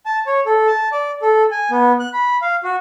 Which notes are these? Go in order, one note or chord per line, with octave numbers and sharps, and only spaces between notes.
A5
C#5
A4
A5
D5
A4
G#5
B3
F#6
B5
F5
F#4